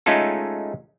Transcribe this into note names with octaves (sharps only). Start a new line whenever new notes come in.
G#3 A3 C#4 D#4 F4 A4